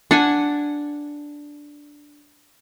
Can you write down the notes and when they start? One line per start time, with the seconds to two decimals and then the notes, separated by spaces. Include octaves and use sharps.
0.11 D4 F#5 G#5